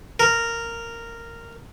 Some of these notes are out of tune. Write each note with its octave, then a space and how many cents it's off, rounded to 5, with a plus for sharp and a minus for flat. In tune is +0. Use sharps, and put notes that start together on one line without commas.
A#4 -10